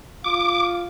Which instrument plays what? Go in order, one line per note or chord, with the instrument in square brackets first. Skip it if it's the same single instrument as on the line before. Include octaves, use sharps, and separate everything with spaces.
[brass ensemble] F4 F5 [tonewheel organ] D6